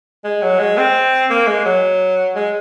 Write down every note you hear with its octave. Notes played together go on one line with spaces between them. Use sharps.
G#3
F#3
G#3
C4
A#3
G#3
F#3
G#3